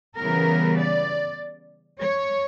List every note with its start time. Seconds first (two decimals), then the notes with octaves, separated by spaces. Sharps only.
0.17 C#3 E3 G3 B3 A#4
0.78 D5
2.01 C#5